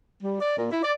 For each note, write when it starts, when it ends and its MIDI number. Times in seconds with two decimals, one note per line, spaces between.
0.22 0.35 55
0.41 0.55 74
0.57 0.69 46
0.71 0.80 64
0.83 0.92 74